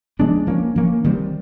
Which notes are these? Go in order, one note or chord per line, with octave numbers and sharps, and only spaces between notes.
F3 G#3 B3 D4
F3 A#3 C#4
F3 A#3 C#4
D#3 G3 C4